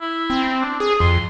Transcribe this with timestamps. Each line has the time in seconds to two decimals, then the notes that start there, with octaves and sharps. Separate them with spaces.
0.01 E4
0.30 C4
0.61 D4
0.80 G#4 D#6
1.00 F2 C6